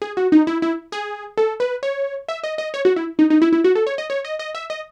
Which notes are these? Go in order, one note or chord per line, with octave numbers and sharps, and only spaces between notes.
G#4
F#4
D#4
E4
E4
G#4
A4
B4
C#5
E5
D#5
D#5
C#5
F#4
E4
D#4
D#4
E4
E4
F#4
A4
C#5
D#5
C#5
D#5
D#5
E5
D#5